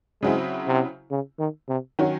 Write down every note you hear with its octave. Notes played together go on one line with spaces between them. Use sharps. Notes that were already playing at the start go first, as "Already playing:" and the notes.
C#3 F#3 G#3 C4 E4
C3
C#3
D#3
C3
D#3 F#3 C#4